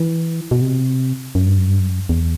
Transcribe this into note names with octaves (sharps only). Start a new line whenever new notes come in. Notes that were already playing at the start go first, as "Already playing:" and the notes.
Already playing: E3
B2
C3
F#2
G2
F#2
G2
F#2
E2